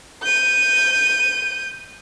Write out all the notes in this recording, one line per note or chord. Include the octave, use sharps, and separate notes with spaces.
G6 D#7